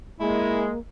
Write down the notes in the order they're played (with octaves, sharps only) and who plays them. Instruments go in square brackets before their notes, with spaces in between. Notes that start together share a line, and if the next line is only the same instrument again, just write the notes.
[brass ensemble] G#3 [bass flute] A#3 [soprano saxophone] E4